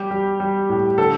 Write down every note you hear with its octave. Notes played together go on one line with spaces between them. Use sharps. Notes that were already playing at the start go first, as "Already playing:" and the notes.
Already playing: G3 G4
G3
G3
A2
D3 A4